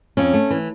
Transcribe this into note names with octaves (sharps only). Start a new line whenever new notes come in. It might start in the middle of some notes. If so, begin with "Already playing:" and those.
F2 C#4
A3
E3